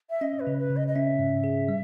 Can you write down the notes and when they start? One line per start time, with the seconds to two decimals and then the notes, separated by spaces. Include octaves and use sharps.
0.10 E5
0.21 C#4 D#5
0.40 B4
0.47 C#3
0.59 B4
0.70 C#3
0.76 D#5
0.88 D#5
0.95 C#4 E5
1.19 G#2
1.44 G#4
1.69 G3